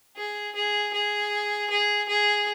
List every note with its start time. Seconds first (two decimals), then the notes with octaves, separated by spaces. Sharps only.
0.17 G#4
0.55 G#4
0.93 G#4
1.70 G#4
2.09 G#4